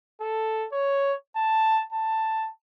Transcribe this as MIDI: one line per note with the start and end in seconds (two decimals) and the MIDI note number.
0.21 0.67 69
0.72 1.14 73
1.36 1.82 81
1.93 2.49 81